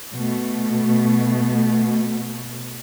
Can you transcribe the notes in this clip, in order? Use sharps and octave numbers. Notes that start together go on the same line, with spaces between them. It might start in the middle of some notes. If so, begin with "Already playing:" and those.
B2 A3